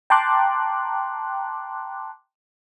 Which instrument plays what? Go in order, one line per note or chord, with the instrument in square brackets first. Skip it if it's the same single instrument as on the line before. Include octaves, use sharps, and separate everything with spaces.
[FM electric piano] G5 A5 A#5 C6 D6 F#6